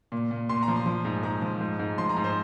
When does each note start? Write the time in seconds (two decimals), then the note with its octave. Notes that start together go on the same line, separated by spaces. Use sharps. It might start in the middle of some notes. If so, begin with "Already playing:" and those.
0.12 A#2
0.31 A#2
0.49 A#2 C6
0.63 A#5
0.68 F3
0.76 C6
0.86 F3
1.05 G#2
1.23 G#2 A#5
1.42 F3
1.61 G#2
1.79 G#2
1.98 F3 C6
2.09 A#5
2.17 G#2
2.24 C5